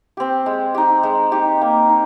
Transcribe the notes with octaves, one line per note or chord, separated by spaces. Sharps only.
C4 G4
G#3
D#4 G4
G#3
D#4 G4
A#3
D#4